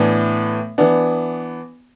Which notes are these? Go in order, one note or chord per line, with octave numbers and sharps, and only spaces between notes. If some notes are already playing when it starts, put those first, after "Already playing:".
Already playing: A2 E3 B3 D4
E3 B3 D4